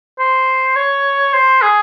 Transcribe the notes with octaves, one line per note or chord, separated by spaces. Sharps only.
C5
C#5
C5
G#4